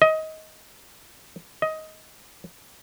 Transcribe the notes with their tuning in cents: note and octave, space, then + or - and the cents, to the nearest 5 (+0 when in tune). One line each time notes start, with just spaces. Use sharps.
D#5 +20
D#5 +15